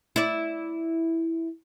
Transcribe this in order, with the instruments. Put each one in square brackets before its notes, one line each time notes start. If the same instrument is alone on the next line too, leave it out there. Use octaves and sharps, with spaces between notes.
[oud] E4 D5